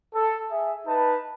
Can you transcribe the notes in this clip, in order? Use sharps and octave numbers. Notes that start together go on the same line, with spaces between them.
A4
G#4 E5
D#4 B4 A5